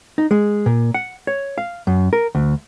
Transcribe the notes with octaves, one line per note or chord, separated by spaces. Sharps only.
D#4
G#3
A#2
F#5
C#5
F5
F#2
A#4
D2